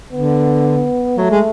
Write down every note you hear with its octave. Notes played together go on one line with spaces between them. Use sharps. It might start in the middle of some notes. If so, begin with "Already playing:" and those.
D3 B3
F#3 A3
G#3